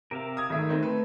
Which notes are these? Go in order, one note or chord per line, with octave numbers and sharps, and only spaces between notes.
C3 A#4 E5 F5
D#6 G#6
G#1 D#3 A3 E5
A3 C4 D#4
A3 B4